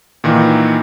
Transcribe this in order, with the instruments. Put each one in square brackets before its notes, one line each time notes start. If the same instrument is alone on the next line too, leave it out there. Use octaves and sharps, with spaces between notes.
[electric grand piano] A#2 D#3 E3